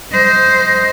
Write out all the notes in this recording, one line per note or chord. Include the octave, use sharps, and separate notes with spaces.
C5 D#5